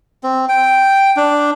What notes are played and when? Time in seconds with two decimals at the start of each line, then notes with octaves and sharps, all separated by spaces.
0.23 C4
0.49 G5
1.16 D4